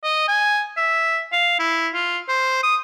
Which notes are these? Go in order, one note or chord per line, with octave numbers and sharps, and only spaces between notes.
D#5
G#5
E5
F5
E4
F4
C5
D#6